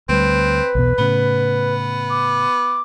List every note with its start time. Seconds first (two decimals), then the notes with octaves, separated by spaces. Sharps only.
0.09 D2 G3 C4 B4
0.75 B1 E2 B2
0.98 A2 C#3 B3
2.10 D6